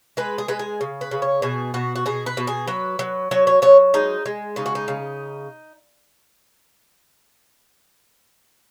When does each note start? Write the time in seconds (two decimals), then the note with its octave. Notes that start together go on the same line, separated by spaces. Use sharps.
0.17 G#3 B4
0.38 G#4
0.48 G#3 B4
0.59 G#4
0.81 C#3
1.01 B4
1.11 C#3
1.22 C#5
1.42 B2 G#4
1.74 B2 F#4
1.96 F#4
2.06 B2 G#4
2.26 B4
2.37 B2
2.47 G#4
2.67 F#3 B4
2.99 F#3
3.31 F#3 C#5
3.47 C#5
3.62 F#3 C#5
3.94 G#3 D#4
4.26 G#3
4.56 C#3 D#4
4.66 F#4
4.75 D#4
4.88 C#3